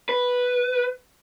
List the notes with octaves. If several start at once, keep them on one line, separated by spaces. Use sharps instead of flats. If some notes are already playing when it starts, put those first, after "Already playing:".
B4